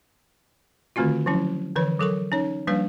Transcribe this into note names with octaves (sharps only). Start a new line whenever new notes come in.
D3 D#3 A3 C4 F4 F#4
F3 F#3 C#4 E4
D3 E3 F3 B4 C#5
F#3 A4 A#4 C#6
C#4 D#4 C#5
F3 G3 A#3 D4 B4 F5